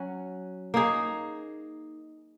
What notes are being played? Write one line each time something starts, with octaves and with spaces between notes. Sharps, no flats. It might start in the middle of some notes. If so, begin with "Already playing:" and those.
Already playing: F#3 C#4 F#4
A#3 D#4 G#4